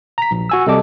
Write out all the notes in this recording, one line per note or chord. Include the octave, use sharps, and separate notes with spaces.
A#5 B6
A#1
F#4 G#5 E6
C3 G3 A4 D#5 A5 D6